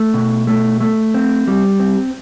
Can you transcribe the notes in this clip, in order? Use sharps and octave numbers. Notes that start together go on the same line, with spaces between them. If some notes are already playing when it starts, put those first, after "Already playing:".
Already playing: A3
B2
A3
A3
C4
G3
C4